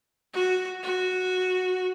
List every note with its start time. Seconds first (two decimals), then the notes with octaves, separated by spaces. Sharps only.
0.34 F#4
0.83 F#4